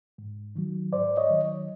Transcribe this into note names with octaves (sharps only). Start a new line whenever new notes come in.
G#2
D#3 F#3
G#2 C5 D5
C#5 D#5
D#3 F#3